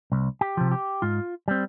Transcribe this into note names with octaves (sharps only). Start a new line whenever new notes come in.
C2
G4
C3 F3
G4
G#2 F4
G3 C4